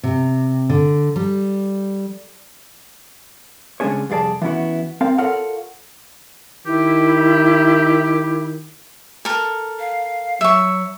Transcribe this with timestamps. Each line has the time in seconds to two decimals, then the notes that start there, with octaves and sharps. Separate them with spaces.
0.04 C3
0.70 D3
1.16 G3
3.80 C#3 G#3 C#4 D4 G#4 C#5
4.10 C2 F2 G#4 D5 A5
4.42 E3 B3 C#4 E4 F#4
5.01 C4 A#4 D5 F5
5.18 F4 A4 A#4 C#5 F5 F#5
6.66 D#3 E4 G4
9.25 A4 A#4
9.79 F5
10.41 F#3 E5 C#6